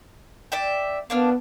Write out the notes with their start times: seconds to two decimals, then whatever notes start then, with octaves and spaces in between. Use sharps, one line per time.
0.52 D5 E5 G5
1.10 A#3 B3 D4 F6